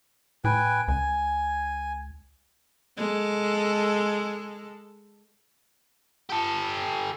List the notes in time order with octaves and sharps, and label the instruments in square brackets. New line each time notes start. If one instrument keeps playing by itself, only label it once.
[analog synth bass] A2 [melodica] B4 G5 G#5
[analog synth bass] C#2 [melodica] G#5
[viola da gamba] G#3 A4
[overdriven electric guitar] G4 A4